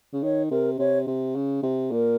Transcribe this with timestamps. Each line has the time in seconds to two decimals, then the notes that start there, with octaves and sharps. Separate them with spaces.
0.13 C#3
0.23 D#3 C#5
0.51 C3 A#4
0.79 C3 C#5
1.07 C3
1.35 C#3
1.63 C3
1.91 A#2 A#4